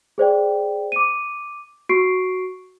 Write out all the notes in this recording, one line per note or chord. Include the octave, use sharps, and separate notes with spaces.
G#4 C5 D5 G5
D6 D#7
F#4 C#6 C7 D7